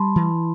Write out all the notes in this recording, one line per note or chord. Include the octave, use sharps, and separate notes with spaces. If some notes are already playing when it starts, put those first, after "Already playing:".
Already playing: G3 A5 B5 C6
E3